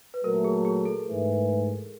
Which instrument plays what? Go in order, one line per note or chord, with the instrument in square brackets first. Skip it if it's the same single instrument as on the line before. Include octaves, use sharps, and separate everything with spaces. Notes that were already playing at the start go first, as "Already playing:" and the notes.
[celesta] B4
[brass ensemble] A#2 F#3 A3 [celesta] A#4
[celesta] G#4
G#4
A4
[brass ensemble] G#2 E3 A3